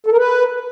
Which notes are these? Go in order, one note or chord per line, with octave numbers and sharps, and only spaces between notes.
A4
A#4
B4